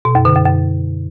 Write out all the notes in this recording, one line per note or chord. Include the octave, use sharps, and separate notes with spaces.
B2
F#2
D3
F#2
F#2